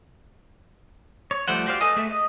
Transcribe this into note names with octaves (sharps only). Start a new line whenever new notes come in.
C#5
F3 G3 A3 C5 F#5
F#4 G4 C5 D5 F5
A4 B4 D#5 G#5 D#6
A3 G#4 E5
D#5